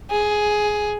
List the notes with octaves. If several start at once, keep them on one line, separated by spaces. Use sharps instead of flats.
G#4